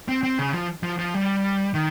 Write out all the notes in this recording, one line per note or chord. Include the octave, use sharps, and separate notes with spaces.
C4
C4
C#3
F3
F3
F3
G3
D#3